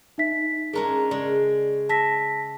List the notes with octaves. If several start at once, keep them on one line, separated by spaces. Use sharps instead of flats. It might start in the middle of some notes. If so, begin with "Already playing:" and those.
D#4 E5 B6
G#3 C#4 D4 G#4 A#4 A#5
C#3 G#3 D5
E5 A5 A#6 B6